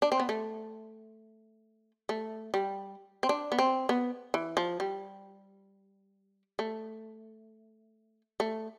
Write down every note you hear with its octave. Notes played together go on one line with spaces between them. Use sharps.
D4
C4
B3
A3
A3
G3
C4
D4
B3
C4
B3
E3
F3
G3
A3
A3